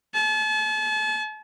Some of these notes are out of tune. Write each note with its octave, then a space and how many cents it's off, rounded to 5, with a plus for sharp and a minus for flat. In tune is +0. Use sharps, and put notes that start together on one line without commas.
A5 -40